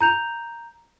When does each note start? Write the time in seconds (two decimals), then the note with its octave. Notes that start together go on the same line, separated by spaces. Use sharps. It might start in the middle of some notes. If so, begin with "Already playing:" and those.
0.01 A#5 G6 F7